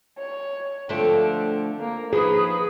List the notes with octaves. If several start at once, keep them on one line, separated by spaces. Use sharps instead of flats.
C#5
D3 F3 A3 C4
A#3
D#3 F3 G#4 B4